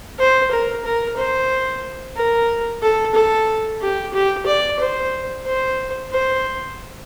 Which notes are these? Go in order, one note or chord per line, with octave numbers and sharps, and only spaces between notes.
C5
A#4
A#4
C5
A#4
A4
A4
G4
G4
D5
C5
C5
C5